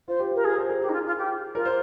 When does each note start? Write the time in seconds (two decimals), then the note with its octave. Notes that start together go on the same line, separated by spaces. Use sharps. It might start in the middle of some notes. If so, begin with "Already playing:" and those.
0.08 F4 C5
0.19 G4
0.32 F4 A#4
0.44 G4 G#4
0.58 C5
0.69 A#4
0.81 G4 G#4
0.89 D#4
0.93 F4
1.06 F4
1.18 G4
1.55 F4 A#4
1.65 C5